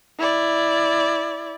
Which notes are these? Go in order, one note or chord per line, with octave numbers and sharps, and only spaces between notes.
E4 D5